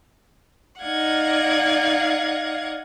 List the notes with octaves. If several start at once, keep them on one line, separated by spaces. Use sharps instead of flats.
D#4 D5 F5 F#5 G#6